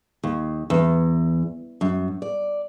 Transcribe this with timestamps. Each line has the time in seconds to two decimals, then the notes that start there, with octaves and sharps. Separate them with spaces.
0.24 D#2
0.70 E2
1.81 F#2
2.22 D5